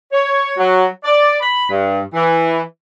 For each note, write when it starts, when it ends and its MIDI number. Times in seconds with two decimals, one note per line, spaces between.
0.12 0.52 73
0.57 0.85 54
1.04 1.35 74
1.41 1.68 83
1.70 2.01 43
2.13 2.60 52